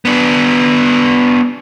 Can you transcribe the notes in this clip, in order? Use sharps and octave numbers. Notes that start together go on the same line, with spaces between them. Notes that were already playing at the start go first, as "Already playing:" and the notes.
B3 D4